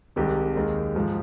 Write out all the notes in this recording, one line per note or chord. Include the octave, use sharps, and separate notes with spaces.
C2 C3 D#3 G#3 G4
D#2 D#3 G#3
G#2 F3 G#3